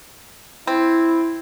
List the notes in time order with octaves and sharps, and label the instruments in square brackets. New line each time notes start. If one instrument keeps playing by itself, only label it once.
[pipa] C4 [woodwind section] E4